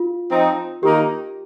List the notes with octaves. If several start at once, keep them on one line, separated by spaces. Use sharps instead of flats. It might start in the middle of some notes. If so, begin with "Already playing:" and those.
Already playing: F4
F3 C4 D#4
D#3 A#3 D#4 G4